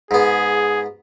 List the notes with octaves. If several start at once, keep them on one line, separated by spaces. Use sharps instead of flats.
G#2 B3 G#4